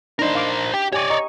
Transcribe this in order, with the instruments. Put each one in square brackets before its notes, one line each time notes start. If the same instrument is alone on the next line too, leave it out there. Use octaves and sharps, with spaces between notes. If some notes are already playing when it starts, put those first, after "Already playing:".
[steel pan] D4 D#4 [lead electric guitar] A#4 C5
[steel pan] F5 D6
[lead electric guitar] G4
[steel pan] G4 G#5 C#6 [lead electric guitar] C#5 D5
[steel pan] D#5 A#5 C#6